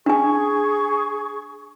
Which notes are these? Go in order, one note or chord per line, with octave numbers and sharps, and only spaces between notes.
D4 G#4 G#5 C#6